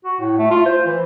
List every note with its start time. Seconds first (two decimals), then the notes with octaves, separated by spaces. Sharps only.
0.05 F#4
0.20 A2
0.38 A3
0.50 F4
0.66 C5
0.86 E3